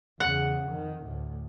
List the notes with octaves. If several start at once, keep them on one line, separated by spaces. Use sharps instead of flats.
E2 C#3 F#5
F2 D#3
D2 A2